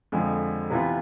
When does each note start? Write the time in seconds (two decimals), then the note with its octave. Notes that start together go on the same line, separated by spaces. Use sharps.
0.12 F2 D3 F3 G#3
0.70 C3 E3 B3 F4 B4